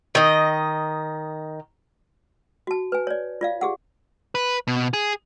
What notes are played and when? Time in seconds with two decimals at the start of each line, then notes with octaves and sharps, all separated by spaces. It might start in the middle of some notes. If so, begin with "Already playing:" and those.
0.15 D#3 D#5
2.67 F#4 A5
2.92 B4 G#5
3.07 C#5 D5
3.41 F4 D5 F5
3.61 G4 G#4 F#5
4.35 B4
4.67 B2
4.93 G#4